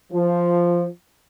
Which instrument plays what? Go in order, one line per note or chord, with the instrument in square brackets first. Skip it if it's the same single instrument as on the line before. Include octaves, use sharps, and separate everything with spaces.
[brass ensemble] F3